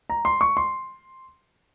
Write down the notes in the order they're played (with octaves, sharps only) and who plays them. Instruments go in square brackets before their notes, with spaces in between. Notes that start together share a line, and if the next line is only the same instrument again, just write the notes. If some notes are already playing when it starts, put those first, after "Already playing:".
[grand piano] A#5
C6
C#6
C6